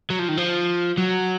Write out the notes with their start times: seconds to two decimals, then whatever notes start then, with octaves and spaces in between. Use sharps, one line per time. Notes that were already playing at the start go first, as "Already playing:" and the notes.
0.10 F#3
0.19 F3
0.28 D#3
0.37 F3
0.98 F#3